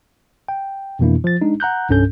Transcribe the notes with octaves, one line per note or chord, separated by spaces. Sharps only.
G5
F2 B2 E3 A#3 D4 E4
F3 A6
G#3 D4 D#4
F#5 A#5 F#6 G6
C2 G2 C#4 A4 G6